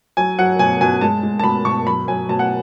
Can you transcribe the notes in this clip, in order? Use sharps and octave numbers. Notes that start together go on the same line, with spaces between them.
F#3 G#5
F#3 F#5
B2 G#5
B2 G#5
G#3 A5
G#3
A5
B2 B5
B2 C#6
F#3 B5
F#3 G#5
B2 A5
F#5